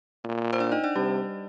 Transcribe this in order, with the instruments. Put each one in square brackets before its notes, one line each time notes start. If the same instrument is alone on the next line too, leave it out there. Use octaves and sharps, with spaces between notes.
[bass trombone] A#2
[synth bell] C5
D4 D5
D#4 D#5
D4 D5
[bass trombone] C3 [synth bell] G3 G4